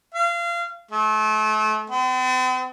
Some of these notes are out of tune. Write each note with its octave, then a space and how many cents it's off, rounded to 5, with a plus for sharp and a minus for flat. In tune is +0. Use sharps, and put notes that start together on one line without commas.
F5 -30
A3 -35
C4 -45